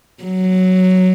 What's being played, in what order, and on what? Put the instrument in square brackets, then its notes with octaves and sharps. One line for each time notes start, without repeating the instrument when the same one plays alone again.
[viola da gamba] F#3